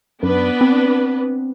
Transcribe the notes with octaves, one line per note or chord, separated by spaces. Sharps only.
F#2 B3 D4 B4
C4